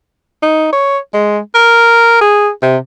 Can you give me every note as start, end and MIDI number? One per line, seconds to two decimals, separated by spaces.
0.43 0.69 63
0.73 0.98 73
1.14 1.39 56
1.55 2.19 70
2.21 2.50 68
2.62 2.77 48